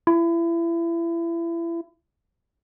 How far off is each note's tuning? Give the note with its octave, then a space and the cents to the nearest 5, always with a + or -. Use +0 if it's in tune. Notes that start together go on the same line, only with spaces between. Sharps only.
E4 +30